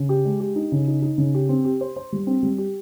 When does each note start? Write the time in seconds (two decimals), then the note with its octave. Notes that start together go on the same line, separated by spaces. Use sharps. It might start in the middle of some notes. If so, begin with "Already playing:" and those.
Already playing: C#3
0.09 G4
0.25 G#3
0.40 G4
0.56 D#4
0.72 C#3
0.88 D#4
1.02 D#4
1.18 C#3
1.35 G4
1.49 C4
1.65 G4
1.81 C5
1.96 C5
2.12 G3
2.27 C4
2.43 G3
2.58 G4